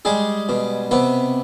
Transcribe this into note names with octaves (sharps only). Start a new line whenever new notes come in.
G3 G#3 G#4
B2
C3 B3 B4